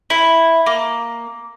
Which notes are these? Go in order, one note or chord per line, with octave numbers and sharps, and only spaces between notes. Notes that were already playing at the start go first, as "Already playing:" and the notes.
E4
A#3